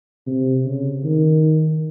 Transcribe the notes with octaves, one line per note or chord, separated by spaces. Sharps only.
C3
C#3
D#3